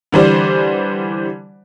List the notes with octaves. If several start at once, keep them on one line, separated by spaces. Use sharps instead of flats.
D3 E3 G3 C5 D5